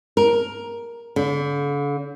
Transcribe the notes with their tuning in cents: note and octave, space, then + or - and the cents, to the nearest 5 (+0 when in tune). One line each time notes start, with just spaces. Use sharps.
A#4 +10
D3 -40